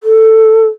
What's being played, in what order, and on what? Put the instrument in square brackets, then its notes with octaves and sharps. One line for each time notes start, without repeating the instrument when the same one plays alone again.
[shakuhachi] A4